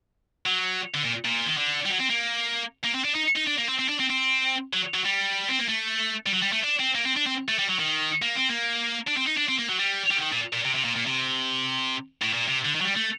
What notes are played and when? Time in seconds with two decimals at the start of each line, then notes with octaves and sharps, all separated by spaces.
0.46 F#3
0.94 D3
1.04 A#2
1.25 A#2
1.46 D#3
1.57 D3
1.85 G3
1.89 F#3
1.99 C4
2.09 A#3
2.84 A#3
2.94 C4
3.04 D4
3.15 D#4
3.36 D#4
3.47 D4
3.58 A#3
3.68 C4
3.79 C4
3.89 D4
4.00 C4
4.10 C4
4.73 F#3
4.94 F#3
5.05 G3
5.49 C4
5.59 A#3
5.69 A3
6.26 G3
6.32 F#3
6.42 G3
6.52 A3
6.64 D4
6.80 C4
6.95 A#3
7.05 C4
7.17 D4
7.26 C4
7.48 A3
7.59 G3
7.69 F#3
7.79 D#3
8.22 A#3
8.35 C4
8.49 A#3
9.08 D4
9.17 C4
9.27 D#4
9.37 D4
9.49 C4
9.59 A#3
9.69 F#3
9.79 G3
10.11 G3
10.17 D3
10.22 D#3
10.32 A#2
10.53 A#2
10.65 C3
10.75 C3
10.85 A#2
10.96 A#2
11.07 C3
12.22 A2
12.33 A#2
12.48 C3
12.65 D3
12.75 D#3
12.81 F#3
12.85 G3
12.96 A3